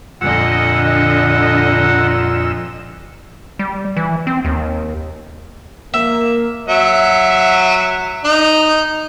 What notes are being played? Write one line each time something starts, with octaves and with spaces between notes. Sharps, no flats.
F2 A#2 D3 D#5 F#5 E6
G3
E3
C4
D#2
A#3 E5
F#3 E5
D#4